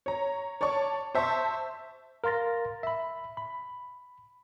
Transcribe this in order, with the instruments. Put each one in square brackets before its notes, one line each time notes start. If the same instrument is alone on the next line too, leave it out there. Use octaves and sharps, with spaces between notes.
[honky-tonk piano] C#5 A#5
C#5 D5 A5 C#6
C5 E5 A5 C6 C#6
[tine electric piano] A#4 F5 C6 A6 A#6
E5 B5
B5